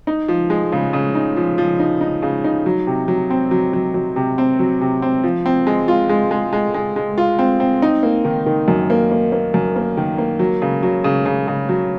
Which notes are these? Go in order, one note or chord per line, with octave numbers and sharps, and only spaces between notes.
D#4
F3
G#3
C#3
C#3
D#4
F3
F3
D#4
D#4
C#3
D#4
F#3
C3
F#3
C4
F#3
F#3
F#3
C3
C4
F#3
C3
C4
F3
C4
G#3
F4
G#3
G#3
G#3
G#3
G#3
F4
C4
C4
D#4
A#3
D#3
D#3
F#2
A#3
A#3
A#3
F#2
A#3
D#3
A#3
F#3
C#3
F#3
C#3
C#3
C#3
F#3